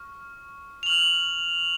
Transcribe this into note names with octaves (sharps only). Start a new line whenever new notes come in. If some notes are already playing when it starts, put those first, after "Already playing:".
Already playing: C#6 F6
F7
C#6 F6 F#7